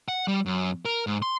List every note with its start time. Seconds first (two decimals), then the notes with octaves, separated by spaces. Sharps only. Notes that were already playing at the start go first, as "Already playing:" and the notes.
0.08 F#5
0.28 G3
0.46 F#2
0.85 A#4
1.07 G#2
1.22 C6